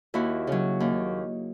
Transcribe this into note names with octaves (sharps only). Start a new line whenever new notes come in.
D#2 E4 F#4
C#3 F#3
D#2